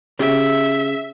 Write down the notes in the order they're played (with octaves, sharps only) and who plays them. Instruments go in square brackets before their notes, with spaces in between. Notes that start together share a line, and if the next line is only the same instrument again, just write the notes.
[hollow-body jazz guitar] C#3 G4 [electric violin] E5